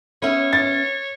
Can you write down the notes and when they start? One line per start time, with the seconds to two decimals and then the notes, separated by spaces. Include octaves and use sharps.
0.22 B3 C#4 C#5 E5
0.53 A6